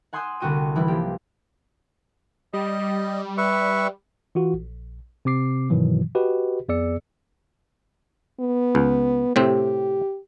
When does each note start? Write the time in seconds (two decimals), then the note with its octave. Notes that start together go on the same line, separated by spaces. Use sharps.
0.13 F#5 G#5 C6 D#6 E6 G6
0.40 C2 D3 A3 F#4 G5 D#7
0.75 E3 G3 E4
0.88 F3 A#3 G4
2.53 G3 D#5
3.38 B4 E5 C#6
4.35 E3 F4 F#4
4.54 A#1
5.25 C3 C4 D6 C7
5.70 G2 B2 D#3 E3 F#3
6.15 F#4 G4 B4 D#5
6.68 F2 B3 G#4 D5 E6 C#7
8.40 B3
8.75 C#2
9.36 A2 C3 C4 G4